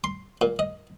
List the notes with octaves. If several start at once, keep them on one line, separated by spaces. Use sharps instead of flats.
C6
A#2
D#5